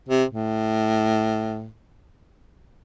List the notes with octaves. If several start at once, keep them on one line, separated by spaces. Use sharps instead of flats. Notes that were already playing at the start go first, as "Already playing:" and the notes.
C3
A2